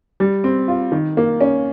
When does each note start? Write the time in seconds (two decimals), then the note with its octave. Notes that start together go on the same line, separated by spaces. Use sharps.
0.20 G3
0.44 C4
0.68 F4
0.92 D#3
1.17 A#3
1.41 C#4